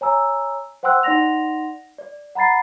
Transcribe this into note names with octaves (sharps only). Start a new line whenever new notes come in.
C#5 G#5 A#5 E6
C5 F#5 G5 C6 E6 F#6
D#4 D5 F#5 C6 A#6 F7
D5
F#5 A#5 B5 A6 C7